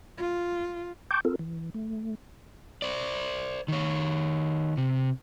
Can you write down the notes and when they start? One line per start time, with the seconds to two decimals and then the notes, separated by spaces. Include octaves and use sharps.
0.18 F4
1.11 G5 A5 C#6 D6 G6
1.25 C4 F4 A4 A#4
1.39 E3
1.74 A3
2.82 C5 D5
3.68 D#3 C#5
4.77 C3